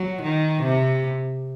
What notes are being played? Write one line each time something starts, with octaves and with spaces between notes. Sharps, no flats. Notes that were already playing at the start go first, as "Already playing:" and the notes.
Already playing: F#3
D#3
C3